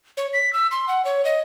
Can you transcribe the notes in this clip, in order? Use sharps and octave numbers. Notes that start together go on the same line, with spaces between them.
C#5
B6
E6
C6
F#5
C#5
D#5